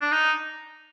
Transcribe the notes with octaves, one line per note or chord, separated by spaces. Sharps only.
D4
D#4